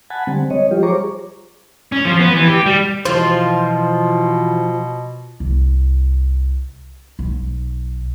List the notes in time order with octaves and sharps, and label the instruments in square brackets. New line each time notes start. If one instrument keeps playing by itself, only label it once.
[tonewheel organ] F#5 G#5 A5 B5
D3 G3 C4
C#5 D#5
F3 G3 F4 G4
G#4 C5 C#5 A#5 C#6 D6
[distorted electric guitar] C#4
F3
B3
E3
G4
G3
[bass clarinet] B2 [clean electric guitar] E3 C5 [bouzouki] F3 F4
[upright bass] C2
B1